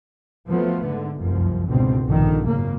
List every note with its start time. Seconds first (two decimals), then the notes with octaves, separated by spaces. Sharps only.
0.49 F3 F#3 A3 B3
0.86 G#2 D3
1.20 F1 C2 F#2 F3
1.68 G#1 C#2 B2 D3 C4
2.05 A#1 G2 B2 D3 D#3
2.47 G#1 F#2 A#2 C#3 A#3